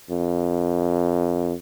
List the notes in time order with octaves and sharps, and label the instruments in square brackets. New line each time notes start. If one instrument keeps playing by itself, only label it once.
[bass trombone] F2